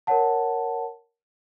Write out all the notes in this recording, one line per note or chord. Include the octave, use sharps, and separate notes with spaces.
A#4 C#5 F#5 A5